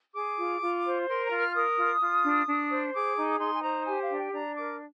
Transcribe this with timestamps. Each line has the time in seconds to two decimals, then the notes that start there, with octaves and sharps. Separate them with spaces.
0.15 G#4 D6
0.38 F4
0.61 F4
0.84 C5
1.07 A#4 C6
1.23 A#5
1.30 F4
1.39 F6
1.55 A#4 D#6
1.77 F4
2.00 F4
2.24 D4
2.47 D4
2.71 C5
2.94 G#4 D6
3.17 D#4
3.40 D#4 C6
3.53 G#5
3.63 C5 A#5
3.86 G4 G#5
4.02 F5
4.10 D4
4.17 G5
4.33 D4 A#5
4.56 A#4 D6